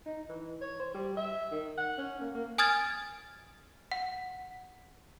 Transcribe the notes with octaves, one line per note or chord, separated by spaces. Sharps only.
D#4
E3
C#5
C5
G3
E5
D#3
F#5
C#4
A#3
A#3
G#5 D#6 F6 G#6 A6
F#5